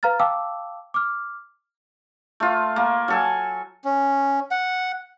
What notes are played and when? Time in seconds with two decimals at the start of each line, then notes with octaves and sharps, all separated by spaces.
0.03 B4 F5 A#5 F6 A6
0.20 F5 G5 A5 D6 E6
0.94 D6 F6
2.40 A3 F4
2.76 A#3
3.08 F#3 A4 G#5
3.85 C#4
4.51 F#5